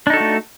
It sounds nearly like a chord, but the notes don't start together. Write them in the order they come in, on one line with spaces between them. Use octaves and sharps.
D4 D#4 A4 F#4 A3